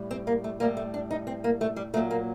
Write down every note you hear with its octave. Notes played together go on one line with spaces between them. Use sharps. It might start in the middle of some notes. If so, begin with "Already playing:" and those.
Already playing: A2 G3
C4
A#3
A3
A2 G3 A#3
A3
D4
D#4
C4
A#3
A3
G3
A#2 F#3 A3
A#3